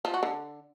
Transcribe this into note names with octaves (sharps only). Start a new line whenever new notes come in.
F3
F#4
D3